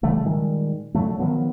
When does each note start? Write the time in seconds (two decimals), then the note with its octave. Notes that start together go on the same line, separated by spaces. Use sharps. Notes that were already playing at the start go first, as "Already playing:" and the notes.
0.03 C#3 E3 G3 A3
0.25 A#2 D#3 G3 G#3
0.95 A#2 D3 F#3 A3
1.19 D#3 F3 F#3 B3